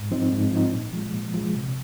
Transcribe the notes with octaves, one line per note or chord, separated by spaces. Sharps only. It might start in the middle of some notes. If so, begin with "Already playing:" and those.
Already playing: G#2
F3 C4 D#4
G#2
F3 C4 D#4
A#2
F3 G#3
A#2
F3 G#3
C3